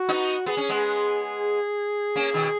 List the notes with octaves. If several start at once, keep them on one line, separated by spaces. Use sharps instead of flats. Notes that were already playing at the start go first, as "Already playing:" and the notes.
Already playing: F#4
B3 D#4
B3 G#4
C#4
G#3 B3
A#3 C#4
B2 D#3